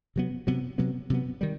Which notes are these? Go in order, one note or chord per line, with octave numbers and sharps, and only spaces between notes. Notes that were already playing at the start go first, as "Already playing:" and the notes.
C3 F#3 B3
C3 F#3 B3
C3 F#3 B3
C3 F#3 B3
D#3 G3